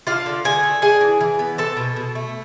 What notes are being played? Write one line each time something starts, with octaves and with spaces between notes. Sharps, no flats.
D4 F4 F5
D3
D3 G#4 G#5
A3
D4 G#4 G#5
E3
E3
B3
C4 A4 A5
B2
B2
A3